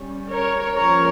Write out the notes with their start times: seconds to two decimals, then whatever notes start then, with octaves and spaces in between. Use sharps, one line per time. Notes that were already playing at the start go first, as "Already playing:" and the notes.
Already playing: G3 C#4
0.30 A#4 C#5
0.76 F3 A#3 C#4 A#4 C#5